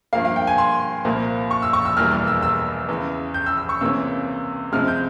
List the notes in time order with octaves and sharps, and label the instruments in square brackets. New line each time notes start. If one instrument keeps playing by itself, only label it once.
[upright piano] G2 F3 A#3 F5
F5
G5
G#5
C6
C2 A#2 F3 A#3
C#6
E6
C#6
E6
E1 E2 E3 G3 A#3 F6
F6
E6
E6
E2 C#3 E3
G6
E6
E6
C#6
C#2 C3 E3 A#3 C#4 E6
C2 C3 F3 G#3 F6
G6